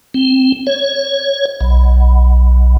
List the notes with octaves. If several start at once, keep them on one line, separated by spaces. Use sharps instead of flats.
C4
C#5
B1